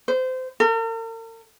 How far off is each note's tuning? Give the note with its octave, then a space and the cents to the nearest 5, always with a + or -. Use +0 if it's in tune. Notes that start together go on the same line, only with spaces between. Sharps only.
C5 -25
A#4 -45